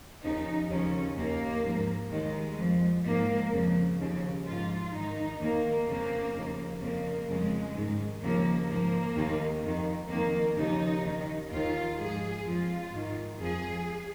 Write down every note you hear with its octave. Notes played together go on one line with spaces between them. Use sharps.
D#2 C#3 F3 D#4
D#2 C#3 F3 C#4
D#2 D#3 A#3
G#2 F3
D#2 D#3 G#3
F2 F3
G#2 F3 A#3
F2 C#3 F3
D#2 C#3 F3
G#2 F3 F4
G#2 D#3 D#4
D#2 D#3 A#3
F2 C#3 F3 A#3
D#2 C#3 F3
F2 C#3 F3 A#3
F2 C#3 F3 G#3
G#2 D#3
D#2 C#3 F3 A#3
G#2 F3 A#3
D#2 D#3
F2 D#3
F2 D#3 A#3
D#2 C#3 F3 D#4
D#2 D#3
D#2 D#3 F4
G#2 F3 G#4
F2 F3 F4
G#2 D#3
F2 F3 G#4